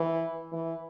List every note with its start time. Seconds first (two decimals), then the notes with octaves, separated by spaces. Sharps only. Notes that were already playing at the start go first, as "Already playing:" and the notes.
Already playing: E3
0.52 E3